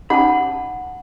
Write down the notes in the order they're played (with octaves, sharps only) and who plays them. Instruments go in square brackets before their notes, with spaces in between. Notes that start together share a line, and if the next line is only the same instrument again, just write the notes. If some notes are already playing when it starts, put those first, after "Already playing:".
[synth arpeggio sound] C#4 D#4 G4 [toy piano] F#5 A5 [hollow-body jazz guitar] B5